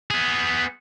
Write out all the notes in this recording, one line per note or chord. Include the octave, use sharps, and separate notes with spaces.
B3 G#4